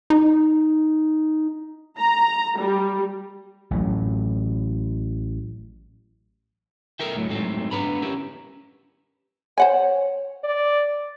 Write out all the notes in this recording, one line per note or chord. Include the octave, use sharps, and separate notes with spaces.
D#4
A#5
G3
A1 A2 F#3
A4 A#4 D#5 E5 G5
D2 A2 F#3
G#2 F#3 G3 A3 C4
D3 B3 D4 B4 A#5 B5
C#4 E4 G4 A#4 B4
C5 C#5 F#5 G#5
D5